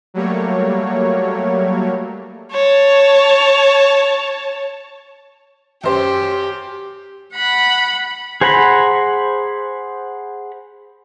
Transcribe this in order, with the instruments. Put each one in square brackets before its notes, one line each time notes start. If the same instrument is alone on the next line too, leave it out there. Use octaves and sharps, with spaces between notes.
[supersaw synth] F#3 G3 A3 A#3 C#5
[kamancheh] C#5 A5
[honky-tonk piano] F#2 C5 [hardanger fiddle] G4
[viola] F#5 B5
[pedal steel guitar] G#4 C5 F#5 A#5 B5